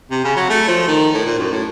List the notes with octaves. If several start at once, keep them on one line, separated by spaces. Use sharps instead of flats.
C3
C#3
F#3
A3
F3
D#3
A2
A#2
F#2
A2